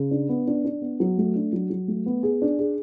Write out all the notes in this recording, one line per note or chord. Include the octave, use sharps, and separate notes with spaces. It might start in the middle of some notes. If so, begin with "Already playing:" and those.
Already playing: C#3
D4
B3
D4
D4
B3
F#3
A3
D4
F#3
F#3
A3
B3
G#4
D4
G#4